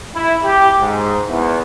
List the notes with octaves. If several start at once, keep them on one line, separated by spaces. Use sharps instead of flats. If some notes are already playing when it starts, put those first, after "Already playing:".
E4
G4
G#2
E2